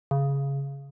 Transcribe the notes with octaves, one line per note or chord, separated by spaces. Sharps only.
C#3